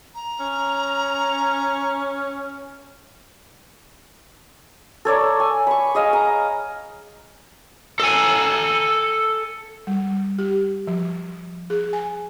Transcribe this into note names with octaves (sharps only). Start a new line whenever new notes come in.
A#5
C#4
A4 C#5 D5 A#5
G#5
B5 C#6
G#4 D#5 F5
A#5
A4 G#5
G3
G4
F3
G#4
G#5